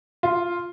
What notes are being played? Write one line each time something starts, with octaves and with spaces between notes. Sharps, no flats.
F4